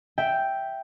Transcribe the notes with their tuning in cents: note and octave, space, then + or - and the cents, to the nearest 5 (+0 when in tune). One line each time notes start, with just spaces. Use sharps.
E5 +0 G5 +0